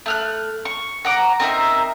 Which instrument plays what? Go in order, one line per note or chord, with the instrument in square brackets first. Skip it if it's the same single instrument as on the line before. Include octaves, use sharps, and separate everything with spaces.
[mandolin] A3 F6 F#6
C#6
F#5 A#5 D6
C4 D#4 A#4 E5